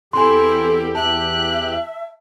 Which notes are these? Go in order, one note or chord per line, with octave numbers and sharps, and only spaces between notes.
E2 C4 E4 G4 A4 G#5 C6
E5 A5 F#6